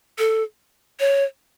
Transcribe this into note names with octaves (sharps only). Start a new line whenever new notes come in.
A4
C#5